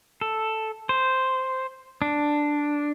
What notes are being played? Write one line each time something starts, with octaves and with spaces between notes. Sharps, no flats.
A4
C5
D4